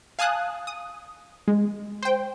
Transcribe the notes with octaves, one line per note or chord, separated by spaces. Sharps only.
F5 G#5 A5 D#6 F#6
D#6
G#3
C5 G5